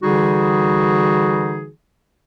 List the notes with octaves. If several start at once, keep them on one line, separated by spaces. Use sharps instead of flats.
D3 E3 G3 D#4 F#4 G#4